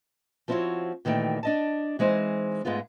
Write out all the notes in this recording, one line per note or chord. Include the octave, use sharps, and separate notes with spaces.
F3 B3 C4 E4 F#4 C#5
A#2 D#3 E3 A3 F#4 G5
D4 D#5 A5
E3 G#3 C4 D#4 C5
G#2 G#3 A3 B3 F4